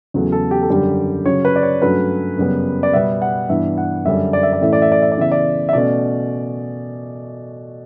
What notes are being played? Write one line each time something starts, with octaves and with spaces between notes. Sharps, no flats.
E2 C#3 F#3 A3
A4
G4
A4
F#2 D3 G3 G4
C#3 F#3 C#4 C#5
B4
D5
C#5
G2 F#3 A3 C#4 B4
F#2 C#3 G3 B3
D5
B2 G3 B3 E5
F#5
G2 E3 B3 E5
F#5
F#2 D3 G3 C#4 E5
D5
E5
D5
A2 E3 A3 C#4 E5
D5
E5
D5
E5
D5
C#3 E3 B3 E5
D5
E5
B2 A3 C#4 D5